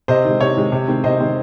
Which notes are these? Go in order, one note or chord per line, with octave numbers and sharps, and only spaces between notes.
C3 C5 D#5
D#3 G#3
C3 C#5
D#3 G#3
C3
D#3 G#3 C4
C3 C5 D#5
D#3 G#3 C4